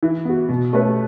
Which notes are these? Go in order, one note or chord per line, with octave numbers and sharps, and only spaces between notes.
E3
B3 F#4
B2
A3 C#4 G4 B4